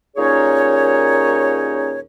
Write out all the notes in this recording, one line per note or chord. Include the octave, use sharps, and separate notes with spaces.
D#2 A#2 C#4 D#4 G#4 C#5